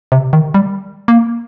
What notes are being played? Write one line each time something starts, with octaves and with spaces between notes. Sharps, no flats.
C3
D#3
G3
A#3